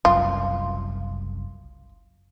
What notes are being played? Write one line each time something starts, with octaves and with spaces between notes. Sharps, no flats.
F#1 C2 F#2 F4